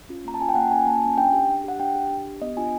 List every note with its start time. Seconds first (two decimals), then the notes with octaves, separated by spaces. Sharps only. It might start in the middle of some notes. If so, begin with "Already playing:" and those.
0.09 C#4 F4
0.25 A#3 A#5
0.34 A5
0.40 C#4 F4 G#5
0.49 G5
0.55 A#3 F#5
0.71 C#4 F4 G#5
0.87 A#3 A5
1.02 C#4 F4 G#5
1.18 D4 G5
1.33 G4
1.49 D4
1.64 G4 F#5
1.80 D4 G5
1.95 G4
2.10 D4
2.26 G4
2.42 B3 D#5
2.57 D4 F4 G#5